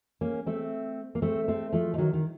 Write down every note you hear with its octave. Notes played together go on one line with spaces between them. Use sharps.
A#3 C#4
A3 C4
A#3
A3 C4
A3 C4
F3 A3
F3
D#3 F#3
D#3